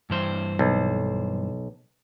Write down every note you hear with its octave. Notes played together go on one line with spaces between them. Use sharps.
G2 E3 C5
B1